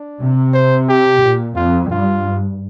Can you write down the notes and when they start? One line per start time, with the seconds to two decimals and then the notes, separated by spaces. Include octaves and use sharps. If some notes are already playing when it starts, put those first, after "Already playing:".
Already playing: D4
0.20 C3
0.54 C5
0.89 G4
1.22 A#2
1.56 F2 F4
1.91 G2 F4